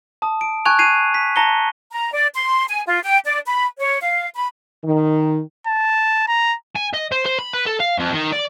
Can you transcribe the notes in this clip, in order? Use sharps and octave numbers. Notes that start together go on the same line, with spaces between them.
A5 D#6
D7
G#5 A5 C#6 F#6 G#6 F7
G#6 C7 D#7 F7
B6
A5 A#5 A#6 C#7 G7
A#5
D5
C6
G#5
F4
G5
D5
B5
C#5
F5
B5
D#3
A5
A#5
G#5
D#5
C5
C5
B5
B4
A4
F5
F2
D#3
D5